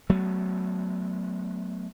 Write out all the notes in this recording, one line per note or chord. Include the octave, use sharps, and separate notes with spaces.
F#3 A3 B3